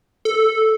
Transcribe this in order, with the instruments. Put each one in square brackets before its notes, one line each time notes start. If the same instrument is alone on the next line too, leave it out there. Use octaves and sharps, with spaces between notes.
[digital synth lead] A4